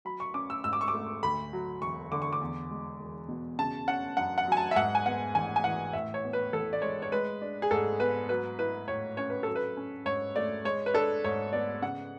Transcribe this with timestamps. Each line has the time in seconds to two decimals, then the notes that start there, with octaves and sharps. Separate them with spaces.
0.05 F#3 B5
0.20 C#6
0.34 C#4 D6
0.50 E6
0.64 G#2 E6
0.73 D6
0.81 C#6
0.88 D6
0.93 A3
1.23 D2 B5
1.53 F#3
1.82 E1 C#6
2.12 D3 D6
2.22 C#6
2.33 D6
2.41 E2
2.70 G#3
3.00 E1
3.29 B2
3.59 C#3 A5
3.87 C#4 F#5
4.17 F#2 F#5
4.38 F#5
4.47 F#3 G#5
4.57 A5
4.71 E5
4.76 G#2 F#5
4.95 G#5
5.06 B3 F#5
5.35 A1 G#5
5.56 G#5
5.64 E3 F#5
5.93 A2 E5
6.14 C#5
6.24 B3
6.33 B4
6.53 A1 A4
6.73 D5
6.82 G#3 C#5
7.02 C#5
7.12 G#3 B4
7.41 D4
7.62 G#4
7.71 G#2 A4
8.00 B3 B4
8.29 F#3 B4
8.59 E4 B4
8.88 A2 C#5
9.17 C#4 C#5
9.30 B4
9.43 F#3 A4
9.55 B4
9.77 C#4
10.05 G#2 C#5
10.36 A3 D5
10.65 G#3 C#5
10.86 B4
10.94 D4 A4
11.24 G#2 C#5
11.53 B3 D5
11.82 C#3 F#5